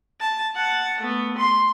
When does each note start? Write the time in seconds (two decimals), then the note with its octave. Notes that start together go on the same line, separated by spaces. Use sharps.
0.20 A5
0.55 F#5 A5
1.00 A3 B3
1.38 C6